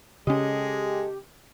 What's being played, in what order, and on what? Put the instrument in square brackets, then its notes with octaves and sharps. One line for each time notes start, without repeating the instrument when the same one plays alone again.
[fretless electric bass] C#3 C#4 [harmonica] G#3 [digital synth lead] G4 [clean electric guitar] A4 D#5